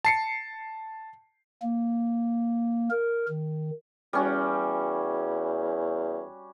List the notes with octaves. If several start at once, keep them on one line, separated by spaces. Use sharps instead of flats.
A5 C7 C#7
A#3
A#4
D#3
E2 G3 C#4 F#4